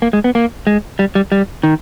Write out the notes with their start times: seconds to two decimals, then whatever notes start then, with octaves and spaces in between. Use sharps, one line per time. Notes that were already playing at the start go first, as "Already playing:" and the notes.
0.02 A#3
0.13 G#3
0.24 B3
0.35 A#3
0.67 G#3
0.99 G3
1.15 G3
1.32 G3
1.63 D#3